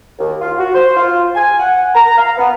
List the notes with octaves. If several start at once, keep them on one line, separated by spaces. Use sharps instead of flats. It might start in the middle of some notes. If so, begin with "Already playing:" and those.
D#2
F4
F#4
C5
F4
G#5
F#5
A#5
F5
B3